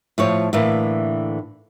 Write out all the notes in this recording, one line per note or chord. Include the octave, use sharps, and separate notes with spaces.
A2 F3 C#5
A2 D3 E3 A#3